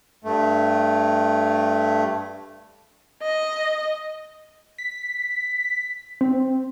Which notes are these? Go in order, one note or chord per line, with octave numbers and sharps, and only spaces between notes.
G2 A3
D#5
B6
C4